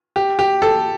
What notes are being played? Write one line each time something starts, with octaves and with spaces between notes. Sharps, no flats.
G4
G4
A4